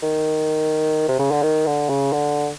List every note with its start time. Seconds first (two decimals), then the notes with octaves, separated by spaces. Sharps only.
0.02 D#3
1.08 C3
1.19 C#3
1.31 D3
1.43 D#3
1.66 D3
1.89 C#3
2.13 D3